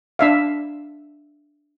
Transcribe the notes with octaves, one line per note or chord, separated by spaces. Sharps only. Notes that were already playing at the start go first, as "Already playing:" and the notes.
D4 E5 F5